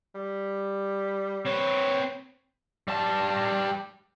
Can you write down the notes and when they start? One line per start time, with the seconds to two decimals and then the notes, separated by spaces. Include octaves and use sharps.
0.15 G3
1.46 C4 B4 C#5
2.88 G3 A5